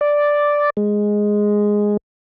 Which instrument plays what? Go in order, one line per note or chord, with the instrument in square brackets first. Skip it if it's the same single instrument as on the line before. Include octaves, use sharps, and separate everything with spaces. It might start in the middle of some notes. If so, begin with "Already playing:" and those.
[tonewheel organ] D5
G#3